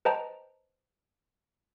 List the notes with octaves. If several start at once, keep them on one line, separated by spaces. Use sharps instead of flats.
B4 C5 D#5 G5 A5 A#5